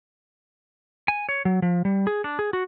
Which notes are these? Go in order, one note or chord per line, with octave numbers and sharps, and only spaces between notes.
G#5
C#5
F#3
F3
G3
G#4
D4
G#4
F#4